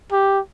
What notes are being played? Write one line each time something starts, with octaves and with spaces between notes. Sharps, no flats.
G4